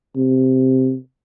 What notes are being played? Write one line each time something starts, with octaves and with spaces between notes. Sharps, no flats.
C3